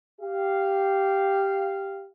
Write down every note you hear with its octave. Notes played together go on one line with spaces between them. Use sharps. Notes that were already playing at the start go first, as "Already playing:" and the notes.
G4 F5